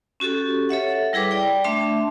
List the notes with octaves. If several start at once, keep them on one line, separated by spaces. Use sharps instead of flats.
C#4 F#4 G4 A4
A4 C#5 E5 F#5
G3 E4 G#4 B4 D6
D5 G5
A3 D4 E5 A5 C6